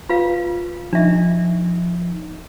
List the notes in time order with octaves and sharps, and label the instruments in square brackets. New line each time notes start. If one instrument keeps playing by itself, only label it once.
[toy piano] F4 B4 F5
[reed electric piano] F3 D#4 [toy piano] D4 E5